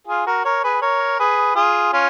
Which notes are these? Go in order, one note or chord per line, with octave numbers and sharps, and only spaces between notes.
F4 G#4
F#4 A#4
A#4 C#5
G#4 B4
A#4 C#5
G#4 B4
F4 G#4
C#4 F4